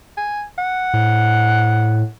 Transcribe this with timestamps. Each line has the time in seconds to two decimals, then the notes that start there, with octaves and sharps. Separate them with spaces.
0.17 G#5
0.58 F#5
0.93 A2